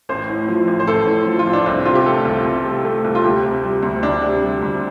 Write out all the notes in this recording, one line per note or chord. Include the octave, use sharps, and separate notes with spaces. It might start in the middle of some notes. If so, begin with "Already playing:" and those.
A1 C5
A2
F3
A1
C5
A1 A4
A2
F3
F4
A1
D4
C2 C4
C3 F4
G4
A3 A4
C2
C2
C3
A3
C2
F4
D2 G4
C3
G3
D2
D2 D4
C3
G3
D2